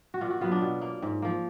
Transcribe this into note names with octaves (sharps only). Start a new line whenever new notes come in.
F#4
A#2 F4
F#4
F#3 B3 F4
D4
B2
A#3
G#2
F3 A#3